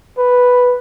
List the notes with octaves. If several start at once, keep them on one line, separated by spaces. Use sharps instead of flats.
B4